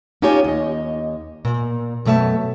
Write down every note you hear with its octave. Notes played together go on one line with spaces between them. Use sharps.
C#4 D#4 F4 G4 C#5 G#5
D#2 D#5
A#2
F#2 B2 A3 E5 A5